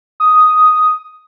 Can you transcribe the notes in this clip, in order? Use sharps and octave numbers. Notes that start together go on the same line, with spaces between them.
D#6